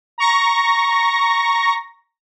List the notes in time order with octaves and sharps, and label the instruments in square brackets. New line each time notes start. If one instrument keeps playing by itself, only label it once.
[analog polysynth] A#5 C#6 A#6